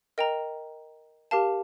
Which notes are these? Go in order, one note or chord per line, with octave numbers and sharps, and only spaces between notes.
A#4 D#5 G5 A#5
G4 A#4 F5 A5